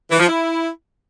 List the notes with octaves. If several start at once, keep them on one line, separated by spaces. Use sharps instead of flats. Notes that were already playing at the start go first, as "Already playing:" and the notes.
E3
F3
E4